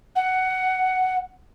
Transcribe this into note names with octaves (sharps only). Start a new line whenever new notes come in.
F#5